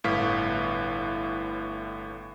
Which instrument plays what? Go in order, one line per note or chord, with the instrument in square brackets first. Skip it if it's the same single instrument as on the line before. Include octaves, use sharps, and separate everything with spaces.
[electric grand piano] G1 A2 B4 F5 F6 B6